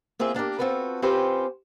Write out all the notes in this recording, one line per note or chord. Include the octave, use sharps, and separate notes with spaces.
A#3 C4 F4 G#4 E5
A#3 D4 G4 A#4
C4 F4 F#4 A4 B4
C4 C#4 F4 G4 B4 C5